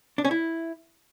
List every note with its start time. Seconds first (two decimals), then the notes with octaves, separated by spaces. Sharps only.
0.18 D4
0.25 C#4
0.31 E4